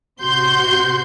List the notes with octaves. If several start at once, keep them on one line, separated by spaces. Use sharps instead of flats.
A1 C3 F#4 C6 G6